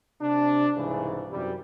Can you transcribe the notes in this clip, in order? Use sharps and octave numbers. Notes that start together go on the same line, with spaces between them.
C3 D4
C2 G#2 C#3 E3
F#2 C3 E3 G3